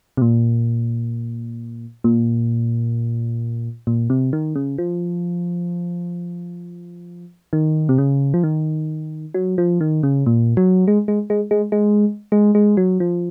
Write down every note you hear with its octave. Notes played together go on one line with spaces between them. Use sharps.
C3
A#2
A#2
A#2
C3
D#3
C#3
F3
D#3
C3
C#3
F3
D#3
F#3
F3
D#3
C#3
A#2
F#3
G#3
G#3
G#3
G#3
G#3
G#3
G#3
F#3
F3